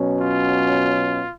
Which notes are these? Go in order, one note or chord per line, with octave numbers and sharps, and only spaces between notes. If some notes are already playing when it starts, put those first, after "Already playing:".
Already playing: B2 F#3 C#4
F4